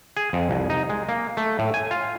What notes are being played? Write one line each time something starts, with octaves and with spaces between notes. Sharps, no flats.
G#4
F2
C2
D#4
G#3
A#3
A3
A2
G#5
F4